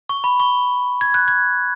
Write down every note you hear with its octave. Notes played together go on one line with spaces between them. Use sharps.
C#6
B5
C#6
G#6
F#6
G#6